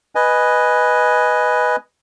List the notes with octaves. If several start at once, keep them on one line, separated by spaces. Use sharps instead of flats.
B4 D#5 G#5